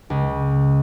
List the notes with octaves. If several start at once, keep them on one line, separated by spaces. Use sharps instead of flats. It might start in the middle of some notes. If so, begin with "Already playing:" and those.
C#2